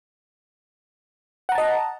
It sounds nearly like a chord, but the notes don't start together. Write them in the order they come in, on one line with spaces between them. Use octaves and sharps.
F#5 A#5 A5 D#5